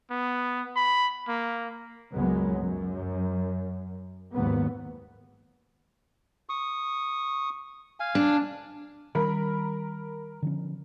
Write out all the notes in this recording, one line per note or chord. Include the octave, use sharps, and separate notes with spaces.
B3
B5
A#3
C#2 F#2 F#3 G#3 B3
F#2
F#1 D#2 G#2 B3
C#6 D#6
F5 G#5
D4
D#3 G3 C#4 A#4 B5
D3 F3 C#4